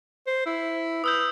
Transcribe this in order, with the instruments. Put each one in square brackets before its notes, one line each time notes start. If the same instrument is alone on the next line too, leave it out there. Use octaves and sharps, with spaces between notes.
[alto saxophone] C5
E4
[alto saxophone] B4 [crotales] D#6 E6 G6